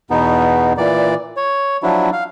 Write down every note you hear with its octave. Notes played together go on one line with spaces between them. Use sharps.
E2 B2 B3 D#4
A#2 E3 D5
C#5
F3 F#3 D4 E4
F5